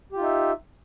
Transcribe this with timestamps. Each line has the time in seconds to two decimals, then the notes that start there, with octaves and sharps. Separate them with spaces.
0.12 G4
0.16 F4
0.20 D#4
0.24 E5